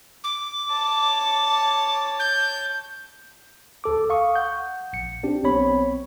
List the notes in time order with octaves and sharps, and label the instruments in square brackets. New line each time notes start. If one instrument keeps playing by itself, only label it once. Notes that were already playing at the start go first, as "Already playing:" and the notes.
[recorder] D6
[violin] C#5 A5
[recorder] G6
[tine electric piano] D2 A4 D6
F5 C#6 D#6
F#5 G6
A#1 C#7
C4 D4 G4
B1 B3 C4 C#5 B5